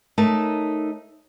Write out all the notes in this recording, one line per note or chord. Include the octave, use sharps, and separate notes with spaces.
A3 D#4 A#4 C#5 A5